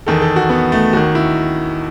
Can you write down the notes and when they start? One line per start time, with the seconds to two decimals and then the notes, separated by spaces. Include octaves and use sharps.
0.07 E2 D#3 A4
0.22 A4
0.36 F#4
0.50 B3
0.72 A3
0.93 D#2 D#3 F#4
1.15 E4